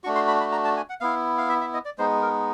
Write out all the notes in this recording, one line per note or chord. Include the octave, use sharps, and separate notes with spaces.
A3 D4 F#4 C#6
C6
B5
B5
A#5
A5
G#5
F#5
B3 E4 F5
F5
E5
E5
D#5
D5
G#3 B3 D#4 C5
A#4